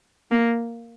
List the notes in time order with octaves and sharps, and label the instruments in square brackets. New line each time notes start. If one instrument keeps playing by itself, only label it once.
[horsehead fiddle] A#3